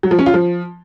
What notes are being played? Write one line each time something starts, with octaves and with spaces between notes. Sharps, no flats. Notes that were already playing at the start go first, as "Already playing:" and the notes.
F#3
F3
C#4
F4
F3